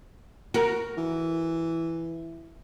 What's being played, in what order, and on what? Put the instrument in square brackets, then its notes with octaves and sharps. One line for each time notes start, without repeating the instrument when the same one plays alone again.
[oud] F#4 A#4
[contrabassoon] E3